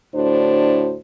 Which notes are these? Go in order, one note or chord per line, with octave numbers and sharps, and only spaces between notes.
D2 A2 D4 F#4 C5